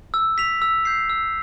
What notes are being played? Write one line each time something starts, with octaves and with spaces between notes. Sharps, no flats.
E6
B6 F7
E6
G6 C7
E6